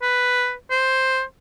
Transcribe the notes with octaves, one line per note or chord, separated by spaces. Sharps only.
B4
C5